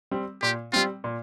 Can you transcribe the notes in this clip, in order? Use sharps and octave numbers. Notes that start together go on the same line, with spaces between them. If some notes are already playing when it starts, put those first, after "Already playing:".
G3 C4
A#2 G4
G3 C4 F4
A#2